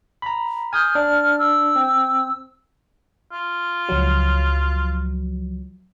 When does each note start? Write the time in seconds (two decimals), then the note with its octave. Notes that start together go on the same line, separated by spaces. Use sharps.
0.22 A#5 B5
0.73 G#5 D#6 F6 G6
0.95 D4
1.39 E6
1.76 C4
3.32 F4
3.89 C#2 F3 F#3